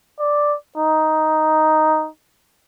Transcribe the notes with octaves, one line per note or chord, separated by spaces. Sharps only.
D5
D#4